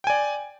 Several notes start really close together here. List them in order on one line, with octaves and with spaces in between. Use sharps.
G5 G#5 D5